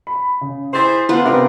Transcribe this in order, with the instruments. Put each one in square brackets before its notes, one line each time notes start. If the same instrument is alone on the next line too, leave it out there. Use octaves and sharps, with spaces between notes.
[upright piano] B5
C#3
[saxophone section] E4 G#4 C5 [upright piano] C6 A6
[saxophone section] D3 A3 B3 [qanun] F4 B4 C5
[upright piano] C3 B3 D6 [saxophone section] D4 D#4 A#4